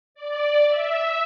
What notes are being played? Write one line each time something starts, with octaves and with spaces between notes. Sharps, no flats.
D5
E5